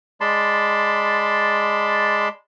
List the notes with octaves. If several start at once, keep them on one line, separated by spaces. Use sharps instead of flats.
G#3 D5 A5 B5 C6